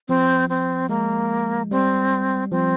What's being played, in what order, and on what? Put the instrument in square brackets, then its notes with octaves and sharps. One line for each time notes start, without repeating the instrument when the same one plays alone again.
[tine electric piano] F3 [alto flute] C4
[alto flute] C4
[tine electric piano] G#3 [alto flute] A#3
[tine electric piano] G3 [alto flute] C4
[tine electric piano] F3 [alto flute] C4